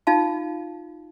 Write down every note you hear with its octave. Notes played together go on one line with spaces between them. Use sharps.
D#4 F4 F5 A5